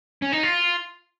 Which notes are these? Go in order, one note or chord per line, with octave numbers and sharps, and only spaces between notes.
C#4
D#4
F4